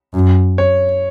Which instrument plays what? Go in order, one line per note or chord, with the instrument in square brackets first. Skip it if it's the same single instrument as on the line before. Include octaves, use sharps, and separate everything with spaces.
[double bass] F#2
[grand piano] C#5